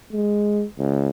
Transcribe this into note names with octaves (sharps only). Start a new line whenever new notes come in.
G#3
C#2